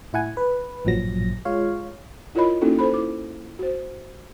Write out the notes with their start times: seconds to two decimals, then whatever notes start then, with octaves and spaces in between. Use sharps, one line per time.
0.13 A2 E4 F#5 G#5
0.37 B4
0.85 A1 G2 A#2 F3 F#3 A#6
1.45 G#3 F4 C#5 F5
2.35 E4 F4 A#4 C#5 D#5 B5
2.61 A#3 C#4 D#4 E4 F#4 A4
2.79 A4 C5 B5
2.94 E4 D6
3.59 F#4 C5